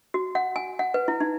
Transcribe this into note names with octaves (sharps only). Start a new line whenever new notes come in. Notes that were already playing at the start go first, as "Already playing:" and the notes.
F#4
F#5
G#5
F#5
B4
E4
D#4